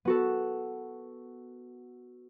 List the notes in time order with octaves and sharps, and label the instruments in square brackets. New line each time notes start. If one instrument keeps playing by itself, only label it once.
[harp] B3 F#4 A4